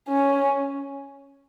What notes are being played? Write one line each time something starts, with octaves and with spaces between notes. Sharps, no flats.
C#4